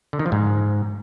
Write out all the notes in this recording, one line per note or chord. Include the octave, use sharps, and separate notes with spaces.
D3
D#3
F3
G#2